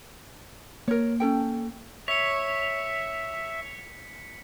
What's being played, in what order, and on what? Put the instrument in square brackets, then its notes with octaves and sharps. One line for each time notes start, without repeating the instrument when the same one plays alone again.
[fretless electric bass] A#3 [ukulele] A#4 C#5
[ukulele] C#4 A4 G5
[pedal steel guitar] C#5 [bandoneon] E5 [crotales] B6 C#7